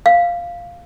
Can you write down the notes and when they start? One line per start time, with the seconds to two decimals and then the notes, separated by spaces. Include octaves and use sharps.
0.06 F5